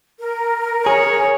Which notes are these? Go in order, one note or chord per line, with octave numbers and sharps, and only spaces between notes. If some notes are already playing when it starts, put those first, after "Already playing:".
A#4
G#4 C#5